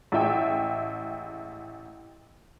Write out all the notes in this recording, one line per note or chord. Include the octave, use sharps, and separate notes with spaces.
A1 G#3 E4 E5 G5